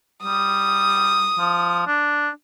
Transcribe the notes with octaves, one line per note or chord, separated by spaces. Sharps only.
G3 D#6
F3
D4